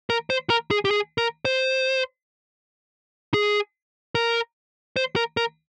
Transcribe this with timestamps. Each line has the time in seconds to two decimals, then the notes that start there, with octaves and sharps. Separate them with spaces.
0.10 A#4
0.30 C5
0.50 A#4
0.71 G#4
0.85 G4
0.91 G#4
1.18 A#4
1.45 C5
3.34 G#4
4.15 A#4
4.96 C5
5.16 A#4
5.37 A#4